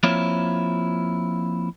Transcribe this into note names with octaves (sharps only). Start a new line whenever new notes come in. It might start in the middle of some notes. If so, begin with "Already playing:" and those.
F3 A#3 C4 E4 F4 C#5